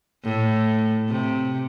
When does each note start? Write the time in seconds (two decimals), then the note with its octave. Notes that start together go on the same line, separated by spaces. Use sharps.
0.25 A2
1.09 C3